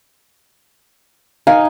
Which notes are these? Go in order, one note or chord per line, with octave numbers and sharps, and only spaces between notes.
D#4 F5 G#5